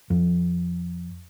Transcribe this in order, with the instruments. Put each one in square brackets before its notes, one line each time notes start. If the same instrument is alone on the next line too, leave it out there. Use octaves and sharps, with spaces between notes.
[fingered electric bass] F2